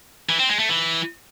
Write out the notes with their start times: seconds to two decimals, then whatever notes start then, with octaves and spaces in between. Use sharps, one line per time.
0.29 E3
0.39 C4
0.49 G#3
0.59 A3
0.69 E3